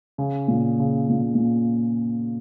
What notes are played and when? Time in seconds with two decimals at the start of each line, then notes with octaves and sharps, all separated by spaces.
0.18 C#3
0.48 A#2
0.79 C#3
1.09 A#2
1.22 C#3
1.35 A#2